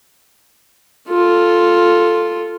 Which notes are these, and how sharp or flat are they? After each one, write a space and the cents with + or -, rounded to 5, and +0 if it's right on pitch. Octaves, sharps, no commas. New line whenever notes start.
F4 +0 A4 +0